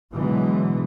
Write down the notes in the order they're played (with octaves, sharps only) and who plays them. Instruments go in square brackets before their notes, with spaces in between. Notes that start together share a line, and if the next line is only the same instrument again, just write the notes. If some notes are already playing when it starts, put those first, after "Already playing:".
[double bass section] B2 D3 E3 F#3 G#3